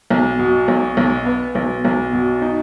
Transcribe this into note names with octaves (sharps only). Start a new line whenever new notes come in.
B1
B2
B1
B1
B3
B1
B1
B2
D#4